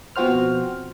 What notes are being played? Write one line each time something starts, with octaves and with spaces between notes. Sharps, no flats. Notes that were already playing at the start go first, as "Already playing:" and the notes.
B2 F3 C4 F#4 C5 F6